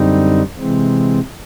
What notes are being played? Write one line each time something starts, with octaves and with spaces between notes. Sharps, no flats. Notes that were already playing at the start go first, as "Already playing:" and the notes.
Already playing: F#2 D3 G3 C4 D#4
C3 E3 G#3 C4